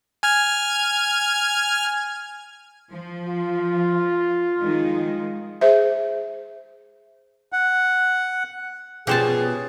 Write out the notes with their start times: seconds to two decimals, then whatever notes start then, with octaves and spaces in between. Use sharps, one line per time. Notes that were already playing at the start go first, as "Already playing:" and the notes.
0.23 G#5 F6 G#6
2.90 F3
3.27 F4
4.60 D#3 G#3 D#4
5.61 G#4 C5 E5
7.53 F#5
9.07 B2 F3 C#4 G4 G#4 C5 A5